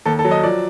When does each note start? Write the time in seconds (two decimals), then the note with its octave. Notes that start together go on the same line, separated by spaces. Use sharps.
0.06 D#2 A4
0.19 A4
0.25 F#3
0.31 D#5
0.43 F3 D5